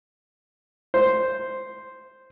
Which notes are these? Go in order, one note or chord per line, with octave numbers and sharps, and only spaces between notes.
C5